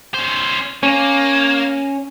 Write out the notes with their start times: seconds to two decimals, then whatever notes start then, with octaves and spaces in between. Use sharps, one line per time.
0.14 C#4 C5
0.83 A#3 C#4